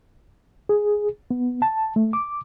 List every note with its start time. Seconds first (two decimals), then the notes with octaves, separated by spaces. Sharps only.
0.69 G#4
1.31 B3
1.62 A5
1.96 A3
2.13 D6